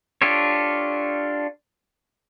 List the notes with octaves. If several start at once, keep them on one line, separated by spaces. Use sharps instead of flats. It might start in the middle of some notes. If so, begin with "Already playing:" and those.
D4 F4 G4 A4 C#5